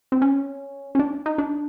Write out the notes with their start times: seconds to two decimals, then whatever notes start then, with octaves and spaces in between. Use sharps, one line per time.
0.12 C4
0.22 C#4
0.95 C#4
0.99 D4
1.26 D#4
1.38 D4